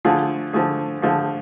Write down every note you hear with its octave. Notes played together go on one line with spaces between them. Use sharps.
D3 F3 A3 F4 G#4
D3 F3 A3 F4 G#4
D3 F3 A3 F4 G#4